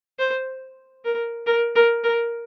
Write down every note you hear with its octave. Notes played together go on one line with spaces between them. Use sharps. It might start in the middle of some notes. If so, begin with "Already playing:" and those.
C5
A#4
A#4
A#4
A#4